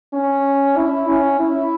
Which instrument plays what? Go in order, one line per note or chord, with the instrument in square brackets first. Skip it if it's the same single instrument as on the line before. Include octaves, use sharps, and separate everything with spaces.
[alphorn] C#4
E4
C#4
E4